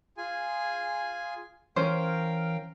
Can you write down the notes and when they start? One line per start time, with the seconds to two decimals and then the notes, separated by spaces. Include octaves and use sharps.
0.17 F4 G#4 G#5
1.76 E3 C#4 A#4 C5 F5 G5